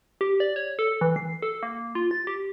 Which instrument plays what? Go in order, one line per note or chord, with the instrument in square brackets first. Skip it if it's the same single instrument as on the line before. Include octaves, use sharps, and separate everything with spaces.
[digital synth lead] G4
D5
C#5
A4
E3
C7
A4
A#3
F4
A6
G4